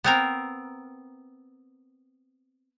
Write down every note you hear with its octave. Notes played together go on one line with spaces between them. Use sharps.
B3 C4 A#4